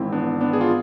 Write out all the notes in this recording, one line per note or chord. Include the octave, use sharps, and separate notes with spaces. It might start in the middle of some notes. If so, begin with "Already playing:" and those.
Already playing: G#1 G#2 E3 C4 E4
B3 D4
B3 D4
G#4
F4